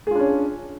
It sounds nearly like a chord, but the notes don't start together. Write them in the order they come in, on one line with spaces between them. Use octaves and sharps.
G#4 F4 D4 C#4